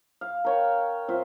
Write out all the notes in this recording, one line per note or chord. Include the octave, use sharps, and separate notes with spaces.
F5
A#4 C#5 G5
C4 F4 E5